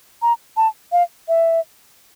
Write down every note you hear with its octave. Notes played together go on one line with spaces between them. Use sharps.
A#5
A5
F5
E5